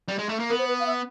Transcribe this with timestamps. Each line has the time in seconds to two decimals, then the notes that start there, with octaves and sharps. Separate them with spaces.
0.08 G3
0.18 G#3
0.29 A3
0.39 A#3
0.50 B3 A#4
0.59 C5
0.68 B4
0.80 F5
0.86 E5